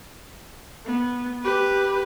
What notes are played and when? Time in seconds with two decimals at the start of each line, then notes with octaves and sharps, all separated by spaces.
0.86 B3
1.43 G4 B4